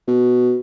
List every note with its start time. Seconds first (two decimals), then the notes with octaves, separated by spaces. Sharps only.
0.08 B2